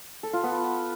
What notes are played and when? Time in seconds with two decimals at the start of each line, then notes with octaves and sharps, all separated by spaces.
0.23 A4
0.33 F4
0.43 B3